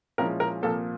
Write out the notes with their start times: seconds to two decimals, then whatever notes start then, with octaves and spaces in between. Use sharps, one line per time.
0.18 A#2 F3 G#3 C#4 E4 A#4
0.40 A#4
0.62 C2 A#2 F3 A#3 A4